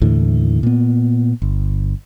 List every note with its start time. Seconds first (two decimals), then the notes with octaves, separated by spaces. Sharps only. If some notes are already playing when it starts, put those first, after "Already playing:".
0.02 D#2 A2 D3 E3
0.63 A#2 B3
1.42 G1